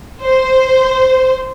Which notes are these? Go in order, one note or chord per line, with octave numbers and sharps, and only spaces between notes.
C5